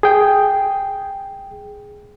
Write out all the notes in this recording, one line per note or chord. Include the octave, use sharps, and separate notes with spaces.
G#4 G5